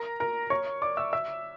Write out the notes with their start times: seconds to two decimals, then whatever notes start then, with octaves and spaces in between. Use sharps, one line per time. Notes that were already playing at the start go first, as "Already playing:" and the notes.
Already playing: A#4 A#5
0.20 A#4 A#5
0.50 C#5 C#6
0.82 D5 D6
0.97 E5 E6
1.13 E5 E6